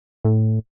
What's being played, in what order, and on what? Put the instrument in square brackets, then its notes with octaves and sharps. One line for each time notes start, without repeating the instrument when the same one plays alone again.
[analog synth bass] A2